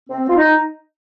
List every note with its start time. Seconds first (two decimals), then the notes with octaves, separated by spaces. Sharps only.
0.09 C4
0.28 F4
0.36 D#4